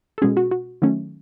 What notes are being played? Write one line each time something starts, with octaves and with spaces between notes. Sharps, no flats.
A4
B2 G#3 C#4 G#4
F#4
F#4
D#3 F#3 A3 C#4